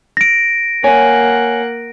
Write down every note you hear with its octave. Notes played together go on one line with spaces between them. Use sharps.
A#6 D7
A#3 C#5 F#5 G#5